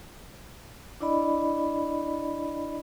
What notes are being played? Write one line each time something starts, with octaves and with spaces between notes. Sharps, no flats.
D4 E4 D5 D#5 B5